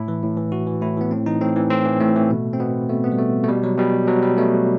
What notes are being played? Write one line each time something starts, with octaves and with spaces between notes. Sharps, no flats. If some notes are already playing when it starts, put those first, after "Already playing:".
Already playing: A2 E4
E3
A2
E3
A2 F#4
E3
A2 E4
E3 B3
A2 C4
E3 D#4
A2 C4
E3
A2 C4
E3
A2 A3
E3
B2
C4
B2 B3
B2 A3
B3
G3
B2 A3
A3
B2 G3
F#3
B2 G3
B2 F#3
G3
B2 A3